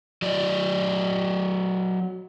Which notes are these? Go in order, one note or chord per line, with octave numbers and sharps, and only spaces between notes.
F#3 D5 D#5